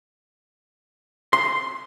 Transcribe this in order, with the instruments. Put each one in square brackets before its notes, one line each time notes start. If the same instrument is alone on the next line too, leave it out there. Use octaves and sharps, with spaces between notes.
[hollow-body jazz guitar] C6